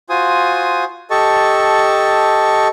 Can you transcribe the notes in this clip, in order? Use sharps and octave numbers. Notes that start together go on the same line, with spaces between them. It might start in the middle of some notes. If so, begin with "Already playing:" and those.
F4 F#4 C5 G#5 D#6
G4 A4 D#5 A5 C#6